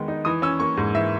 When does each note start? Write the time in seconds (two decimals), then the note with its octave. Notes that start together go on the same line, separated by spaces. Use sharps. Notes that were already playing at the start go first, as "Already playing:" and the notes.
Already playing: D#3 G#3 B3
0.08 D#4
0.25 E3 D#6
0.42 C#4 E6
0.60 A#3 C#6
0.77 G#2
0.94 E3 E5